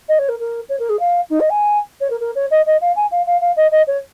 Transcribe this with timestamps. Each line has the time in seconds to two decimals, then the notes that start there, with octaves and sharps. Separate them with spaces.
0.09 D#5
0.19 C#5
0.29 A#4
0.39 A#4
0.69 C#5
0.79 A#4
0.89 G#4
1.00 F5
1.30 D#4
1.40 D#5
1.50 G#5
2.01 C#5
2.10 A#4
2.20 A#4
2.35 C#5
2.51 D#5
2.66 D#5
2.81 F5
2.96 G#5
3.12 F5
3.26 F5
3.41 F5
3.57 D#5
3.71 D#5
3.87 C#5